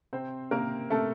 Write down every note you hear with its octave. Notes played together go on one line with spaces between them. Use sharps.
C3 C4 C5
C3 A#3 A#4
C3 A3 A4